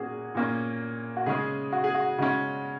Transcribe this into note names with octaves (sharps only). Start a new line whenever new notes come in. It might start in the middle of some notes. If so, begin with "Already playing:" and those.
Already playing: A#2 A#3 C#4 F#4 G#4
A#2 A#3 C#4
F#4
C#3 G#3 C#4 G#4
F#4
G#4
F#4
C#3 G#3 C#4 F#4